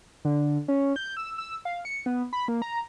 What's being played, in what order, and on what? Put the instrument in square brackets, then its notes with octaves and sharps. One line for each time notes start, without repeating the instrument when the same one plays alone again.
[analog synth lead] D3
C#4
G6
E6
E6
F5
C#7
B3
B5
A#3
A#5